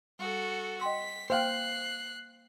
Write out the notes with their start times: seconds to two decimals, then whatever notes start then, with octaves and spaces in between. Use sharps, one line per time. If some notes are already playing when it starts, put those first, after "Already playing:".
0.19 G3 F#4 A4
0.81 D#5 G5 C6 B6
1.30 A#3 C5 F5 G5 F#6 C7